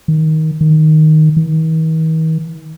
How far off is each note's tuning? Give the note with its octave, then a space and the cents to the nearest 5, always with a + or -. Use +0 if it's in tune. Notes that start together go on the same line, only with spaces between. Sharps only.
D#3 +15
D#3 +0
D#3 +45